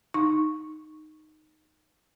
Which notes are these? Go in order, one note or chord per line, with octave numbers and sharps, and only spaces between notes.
D#4 C#6